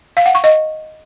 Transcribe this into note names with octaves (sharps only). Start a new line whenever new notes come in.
F5
F#5
C#6
D#5